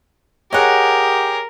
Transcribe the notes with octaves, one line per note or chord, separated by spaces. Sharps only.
G4 G#4 A#4 C#5 D#5 F#5